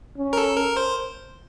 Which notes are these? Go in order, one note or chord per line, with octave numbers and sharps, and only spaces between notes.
C#4
A#4
A4
A#4
C5